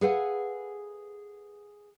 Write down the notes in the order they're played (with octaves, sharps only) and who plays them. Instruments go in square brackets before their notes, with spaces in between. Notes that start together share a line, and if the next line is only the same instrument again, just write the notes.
[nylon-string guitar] G#4 A4 B4 F5 F#5 G#5